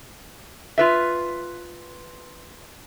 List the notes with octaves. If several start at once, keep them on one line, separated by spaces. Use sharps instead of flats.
F4 B4 E5